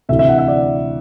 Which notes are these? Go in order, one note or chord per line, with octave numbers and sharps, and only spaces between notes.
D2 C3 E3 E5
E5
F#5
E5
D5